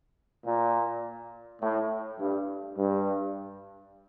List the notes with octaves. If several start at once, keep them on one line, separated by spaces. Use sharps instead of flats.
A#2
A2
G2
G2